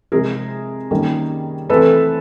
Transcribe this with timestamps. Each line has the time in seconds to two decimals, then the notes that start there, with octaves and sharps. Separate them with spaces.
0.12 C3 F3 G#3 G#4 A#4
0.91 D#3 G3 A#3 C#4
1.69 E3 A3 C4 A4 B4